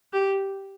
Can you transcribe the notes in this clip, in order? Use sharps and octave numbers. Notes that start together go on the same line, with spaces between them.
G4